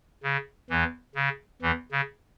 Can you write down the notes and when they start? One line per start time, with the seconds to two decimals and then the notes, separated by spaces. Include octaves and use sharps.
0.23 C#3
0.70 E2 E3
1.15 C#3
1.62 E2 E3
1.92 C#3